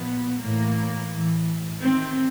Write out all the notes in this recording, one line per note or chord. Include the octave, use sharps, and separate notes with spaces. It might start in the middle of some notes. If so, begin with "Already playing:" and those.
Already playing: A#2 F3 B3
A2 E3 A#3
A2 E3
C3 D#3 C4